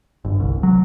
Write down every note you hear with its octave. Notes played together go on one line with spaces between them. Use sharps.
G1
C2
F#3